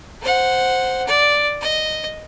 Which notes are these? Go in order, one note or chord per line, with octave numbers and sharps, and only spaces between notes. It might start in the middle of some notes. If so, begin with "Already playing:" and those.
C5 F#5
D5
D#5